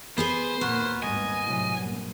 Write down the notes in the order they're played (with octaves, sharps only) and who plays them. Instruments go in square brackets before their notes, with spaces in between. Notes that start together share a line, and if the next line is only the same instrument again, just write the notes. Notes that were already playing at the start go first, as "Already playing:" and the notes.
[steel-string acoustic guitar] B3 G#4 B4 [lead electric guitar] C5
[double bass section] D#2 A#2 [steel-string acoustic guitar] B3 [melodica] F#4 A#4 B4
[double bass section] G#1 G2 [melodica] D#5 [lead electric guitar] G#5
[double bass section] A2 C3 F#3
A#1 G2